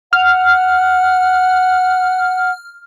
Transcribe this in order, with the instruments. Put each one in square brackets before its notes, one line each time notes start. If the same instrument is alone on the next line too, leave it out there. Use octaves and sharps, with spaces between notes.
[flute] F#5 [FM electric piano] F6